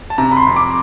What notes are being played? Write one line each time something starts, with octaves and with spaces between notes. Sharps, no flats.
A5
C3 A#5
B5
C6
F2
D6